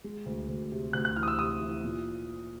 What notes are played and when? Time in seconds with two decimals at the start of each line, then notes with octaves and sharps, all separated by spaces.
0.04 G#3
0.26 D2
0.48 D2
0.72 C3
0.93 D2 F#6
1.05 F#6
1.16 E3 F6
1.23 D#6
1.28 E6
1.38 C3 D#6
1.61 E3
1.84 A#2